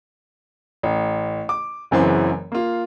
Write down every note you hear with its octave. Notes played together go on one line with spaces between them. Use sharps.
A1
D6
F#1 F#2 C#3 E3 C4 C6
A#3 F4